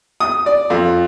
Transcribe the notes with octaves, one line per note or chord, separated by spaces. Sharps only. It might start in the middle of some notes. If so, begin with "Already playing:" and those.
D#6
D5
F2